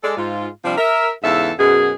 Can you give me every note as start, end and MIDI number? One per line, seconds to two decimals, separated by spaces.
0.03 0.17 56
0.03 0.17 69
0.03 0.17 74
0.17 0.48 44
0.17 0.48 65
0.64 0.74 48
0.64 0.74 53
0.64 0.74 55
0.64 0.74 62
0.78 1.11 70
0.78 1.11 76
1.23 1.52 40
1.23 1.52 44
1.23 1.52 49
1.23 1.52 69
1.23 1.52 76
1.23 1.52 77
1.58 1.92 42
1.58 1.92 47
1.58 1.92 68